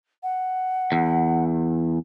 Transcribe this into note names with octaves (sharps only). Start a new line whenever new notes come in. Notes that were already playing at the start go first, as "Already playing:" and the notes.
F#5
E2